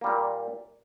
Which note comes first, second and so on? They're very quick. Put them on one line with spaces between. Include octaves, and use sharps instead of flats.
A#3 G3 A#2